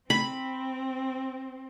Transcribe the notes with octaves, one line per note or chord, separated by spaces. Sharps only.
C4 B5